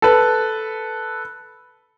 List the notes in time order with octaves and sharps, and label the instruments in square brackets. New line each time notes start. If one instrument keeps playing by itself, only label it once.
[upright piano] A4 B4